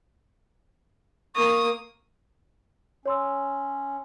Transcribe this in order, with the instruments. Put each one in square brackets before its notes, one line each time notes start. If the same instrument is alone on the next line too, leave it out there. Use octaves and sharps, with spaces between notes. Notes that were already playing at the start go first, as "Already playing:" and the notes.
[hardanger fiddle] A#3 D#6 [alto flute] C#6
[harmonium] C#4 [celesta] C#5 C6 E6